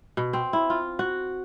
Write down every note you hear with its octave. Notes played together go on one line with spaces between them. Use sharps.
B2
C4
E4
F4
F#4